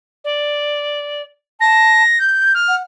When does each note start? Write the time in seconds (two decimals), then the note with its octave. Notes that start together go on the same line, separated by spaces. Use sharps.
0.24 D5
1.61 A5 A#6
2.20 G6
2.54 F6
2.68 F#5